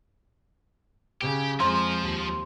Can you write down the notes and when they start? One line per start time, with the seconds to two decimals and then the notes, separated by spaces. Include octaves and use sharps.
1.21 C#3 G4
1.60 F2 F3 G#3 C5 A#5 C6
2.01 D#2